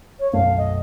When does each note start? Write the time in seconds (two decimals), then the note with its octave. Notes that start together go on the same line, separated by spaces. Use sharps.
0.20 C#5
0.33 B1 F#2 A3 F5
0.58 D#5